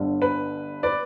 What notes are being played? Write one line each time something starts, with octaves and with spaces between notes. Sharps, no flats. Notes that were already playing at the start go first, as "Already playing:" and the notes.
Already playing: G1 G2 D3
B4
B4 D5